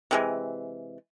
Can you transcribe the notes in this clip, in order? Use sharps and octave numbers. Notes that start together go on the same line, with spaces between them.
C3 E3 G#3